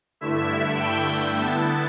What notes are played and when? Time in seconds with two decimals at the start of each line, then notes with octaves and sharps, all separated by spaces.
0.21 G2 D3 A3 E4 E5
0.80 G5
1.39 D3 B3 E4 A5